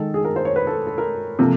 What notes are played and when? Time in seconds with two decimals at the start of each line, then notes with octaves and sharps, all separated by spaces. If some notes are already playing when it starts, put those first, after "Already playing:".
Already playing: D#3 G#3 A4
0.14 G#4
0.25 A#4
0.36 C5
0.45 C#5
0.56 B4
0.67 A4
0.87 A4
0.98 A#4
1.39 C3 F3 A#3 A4